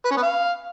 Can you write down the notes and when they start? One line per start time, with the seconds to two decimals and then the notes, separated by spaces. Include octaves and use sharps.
0.05 B4
0.11 C#4
0.17 B3
0.22 F5